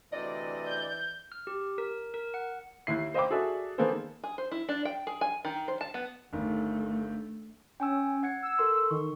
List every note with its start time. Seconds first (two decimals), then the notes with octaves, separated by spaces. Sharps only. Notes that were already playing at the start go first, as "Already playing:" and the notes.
0.12 D2 C3 E3 D5 D#5
0.66 G6
1.32 F6
1.47 G4
1.78 A#4
2.14 A#4
2.34 F#5
2.87 D#2 E4 C7
3.14 C5 D#5 F5 G5 B5 D6
3.30 F#4 G#4 A4 D5 E5
3.78 D#3 A#3 B3 G#4 A4 C5
4.24 G#4
4.38 C5
4.51 E4
4.69 D4
4.85 G5
5.07 G#4
5.21 G#5
5.45 D#3
5.68 C5
5.81 A5
5.94 B3
6.33 G1 D#3 A3
7.80 C#4 G5 G#5 E6
8.23 F#5 G#6 C#7
8.42 E6
8.59 A4 A#4 C6
8.91 D#3 C#6